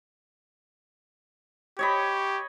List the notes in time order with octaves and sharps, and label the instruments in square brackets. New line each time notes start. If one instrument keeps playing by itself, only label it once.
[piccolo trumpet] G4 [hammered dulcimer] C#5 D#5 B5